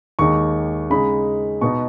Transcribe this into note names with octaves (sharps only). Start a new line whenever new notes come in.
D#2 D#3 G#3 D#4 C#6
C#3 G#3 D#4 B5
B2 B3 D#4 C#6